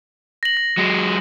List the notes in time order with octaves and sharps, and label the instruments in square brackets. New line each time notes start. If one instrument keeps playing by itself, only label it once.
[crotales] A#6 F#7
A#6
[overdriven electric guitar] F#3 G#3